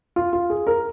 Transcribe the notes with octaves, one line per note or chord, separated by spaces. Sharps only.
F4
F4
G#4
A#4